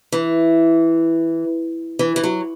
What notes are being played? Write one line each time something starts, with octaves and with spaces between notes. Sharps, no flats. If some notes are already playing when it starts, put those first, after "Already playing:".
E3
E3
E3
F#3